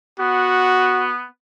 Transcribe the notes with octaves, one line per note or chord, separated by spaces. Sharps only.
B3 F#4